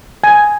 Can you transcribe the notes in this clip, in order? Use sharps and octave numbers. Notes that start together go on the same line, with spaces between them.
G#5